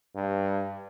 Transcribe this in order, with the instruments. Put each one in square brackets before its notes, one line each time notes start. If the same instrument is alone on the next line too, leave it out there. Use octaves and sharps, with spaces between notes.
[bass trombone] G2